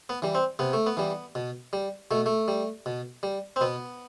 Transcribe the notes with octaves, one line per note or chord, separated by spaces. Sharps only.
B3
E3 G3
C4
C3 B3
A3
B3
E3 G3
B2
G3
B2 A3
A3
G3
B2
G3
C4
B2 B3